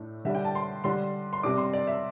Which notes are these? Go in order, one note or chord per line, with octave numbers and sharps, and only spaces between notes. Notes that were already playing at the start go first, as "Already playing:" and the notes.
Already playing: A2 A3 D4
D3 G3 D4 E5
G5
A5
C6
D3 G3 D4 C6
C6
C3 G3 D4 D6
C6
D5
E5